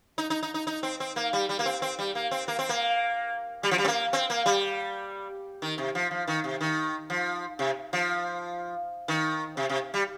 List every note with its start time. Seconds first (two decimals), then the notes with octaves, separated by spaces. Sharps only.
0.18 D#4
0.30 D#4
0.43 D#4
0.54 D#4
0.67 D#4
0.83 C4
1.00 C4
1.16 A#3
1.33 G3
1.49 G3
1.59 A#3
1.66 C4
1.82 C4
1.99 G3
2.15 A#3
2.31 C4
2.48 A#3
2.59 C4
2.69 A#3
3.63 G3
3.71 F3
3.78 G3
3.84 C4
3.88 A#3
4.13 C4
4.30 A#3
4.46 G3
5.62 D#3
5.78 C3
5.95 F3
6.11 F3
6.28 D#3
6.44 C3
6.61 D#3
7.10 F3
7.59 C3
7.93 F3
9.08 D#3
9.57 C3
9.69 C3
9.94 G3